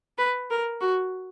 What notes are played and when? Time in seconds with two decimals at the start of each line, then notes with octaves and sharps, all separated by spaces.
0.18 B4
0.51 A#4
0.81 F#4